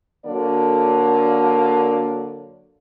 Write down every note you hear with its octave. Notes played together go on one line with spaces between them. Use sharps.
D3 F#3 A#3 A4 D5